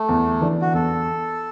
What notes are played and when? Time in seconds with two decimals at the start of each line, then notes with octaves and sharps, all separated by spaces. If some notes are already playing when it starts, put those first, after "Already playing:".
Already playing: A3
0.09 E2
0.41 E3 D4
0.61 F#4
0.74 E2 A4